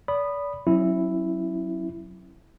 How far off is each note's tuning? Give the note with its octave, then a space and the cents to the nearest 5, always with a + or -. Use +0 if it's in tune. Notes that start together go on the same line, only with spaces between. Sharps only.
D5 -35 B5 +0 D#6 -20
F#3 +0 C#4 -35 E4 +0